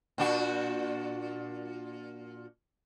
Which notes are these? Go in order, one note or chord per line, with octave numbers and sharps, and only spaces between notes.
A#2 D4 F#4